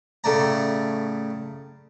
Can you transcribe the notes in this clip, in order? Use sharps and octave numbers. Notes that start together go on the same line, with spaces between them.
A2 C#3 A3 D5 A#5